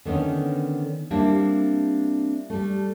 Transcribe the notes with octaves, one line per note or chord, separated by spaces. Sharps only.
D3 D#3 B3 C#4
G3 A#3 C4 D4 E4
G3 A3